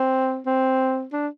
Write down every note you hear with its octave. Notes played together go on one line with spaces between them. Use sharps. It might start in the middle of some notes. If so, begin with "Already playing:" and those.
Already playing: C4
C4
D4